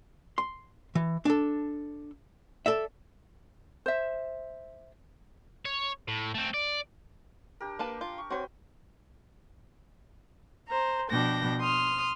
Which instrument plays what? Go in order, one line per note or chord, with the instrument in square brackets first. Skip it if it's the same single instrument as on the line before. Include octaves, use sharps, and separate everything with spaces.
[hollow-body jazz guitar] C6
E3
D4 A4
A4 D5 E5
[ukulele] C5 E5
[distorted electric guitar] C#5
A2
A3 C4
D5
[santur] D4 G4 A#4
[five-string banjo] A#3 B4 A5
F4
[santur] C#6
[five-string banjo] C4 C#5 [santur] F#4 B4 G5
[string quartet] C5 A#5
B2 F3 D4 G5 A#6
C6 D#6 F6